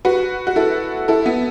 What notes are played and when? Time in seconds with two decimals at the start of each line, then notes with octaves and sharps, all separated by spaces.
0.05 F#4 B4
0.47 F#4
0.56 E4 A4
1.08 E4 A4
1.26 B3 E4